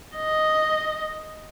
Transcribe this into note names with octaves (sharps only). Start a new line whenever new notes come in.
D#5